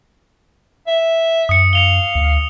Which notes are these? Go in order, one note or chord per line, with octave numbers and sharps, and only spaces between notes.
E5
F#2 D#6 C#7
F5 C#7 F7 G7
D2